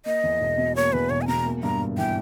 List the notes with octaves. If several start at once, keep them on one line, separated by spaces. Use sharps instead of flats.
A#3 D#5
E2
E1
B2
A#3 C#5
E2 B4
E1 C#5
G#5
B2 A#5
A#3
G2 A#5
G#1
E3 G5